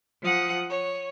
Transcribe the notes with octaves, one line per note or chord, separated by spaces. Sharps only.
F3 F#5 D#6
C#5